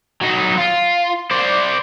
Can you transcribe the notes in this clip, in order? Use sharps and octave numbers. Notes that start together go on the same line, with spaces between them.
F#3 D#4
F4
C5 D5